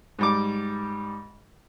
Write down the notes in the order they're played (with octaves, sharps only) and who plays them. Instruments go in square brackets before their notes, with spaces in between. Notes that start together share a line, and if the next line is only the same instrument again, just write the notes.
[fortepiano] G#2 G3 D6